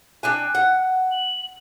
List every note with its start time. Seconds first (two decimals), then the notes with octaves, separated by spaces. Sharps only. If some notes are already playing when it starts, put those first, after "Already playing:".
0.23 D4 G5 G#5 F#6
0.55 F#5
1.12 F#7